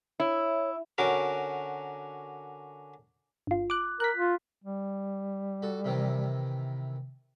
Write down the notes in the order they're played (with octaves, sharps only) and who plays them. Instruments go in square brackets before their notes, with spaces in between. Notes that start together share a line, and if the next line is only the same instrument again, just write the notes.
[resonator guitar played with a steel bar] E4 [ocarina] C#5
[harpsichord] D3 C#4 F#4 A#4 D6
[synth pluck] G1 F4
D6 F#6
[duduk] A#4 [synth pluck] F#6 B6
[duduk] F4
G3
[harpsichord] F#4 A4
C3 D#3 E3